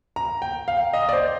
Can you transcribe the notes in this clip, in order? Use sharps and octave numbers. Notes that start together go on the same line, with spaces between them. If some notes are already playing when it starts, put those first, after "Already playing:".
A#5
G5
F5
D#5
D5
C5